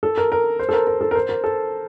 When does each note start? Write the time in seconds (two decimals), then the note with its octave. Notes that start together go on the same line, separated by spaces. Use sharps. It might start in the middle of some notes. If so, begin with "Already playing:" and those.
0.03 A4
0.17 A#4
0.32 A#4
0.59 C5
0.69 A4
0.73 A#4
0.87 A#4
1.01 A4
1.11 A#4
1.15 C5
1.29 A#4
1.44 A4